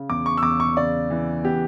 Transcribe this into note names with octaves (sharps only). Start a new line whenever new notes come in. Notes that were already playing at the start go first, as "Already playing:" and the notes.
Already playing: C#3
E2 D6
C#6
E6
E2 D6
C#6
C#3 D5
E3
B3 G4